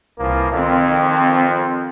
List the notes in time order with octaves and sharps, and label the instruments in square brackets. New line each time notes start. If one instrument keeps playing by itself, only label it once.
[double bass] C2 [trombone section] E3 F3 A#3
[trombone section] F2 [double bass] D#3 C4